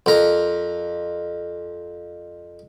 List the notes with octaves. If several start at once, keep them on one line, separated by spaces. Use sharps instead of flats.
F2 A#4